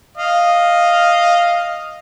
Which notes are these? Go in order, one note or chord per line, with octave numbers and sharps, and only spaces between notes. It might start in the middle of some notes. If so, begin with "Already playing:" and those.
D#5 F5